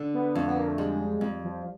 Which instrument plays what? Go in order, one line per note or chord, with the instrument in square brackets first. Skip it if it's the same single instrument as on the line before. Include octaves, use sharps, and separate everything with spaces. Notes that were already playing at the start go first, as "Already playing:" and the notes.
Already playing: [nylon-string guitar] D3
[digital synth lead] B3
[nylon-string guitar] F2 [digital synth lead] A3
[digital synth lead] B3
A#3
A3
[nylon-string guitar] G3 [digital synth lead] G#3
[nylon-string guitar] F2
[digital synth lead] F3